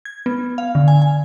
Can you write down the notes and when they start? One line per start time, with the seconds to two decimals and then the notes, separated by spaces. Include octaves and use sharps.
0.05 G#6
0.26 B3
0.58 F5
0.75 D3
0.88 G#5
1.02 G#5